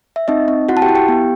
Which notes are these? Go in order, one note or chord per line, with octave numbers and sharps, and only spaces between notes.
E5
C4 D#4 D#5
C4
E4 F#4 F#5
A5
G4 G5
E4
G4 G5
B3